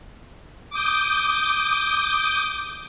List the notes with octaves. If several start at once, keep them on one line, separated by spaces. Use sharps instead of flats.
D6 D#6 G6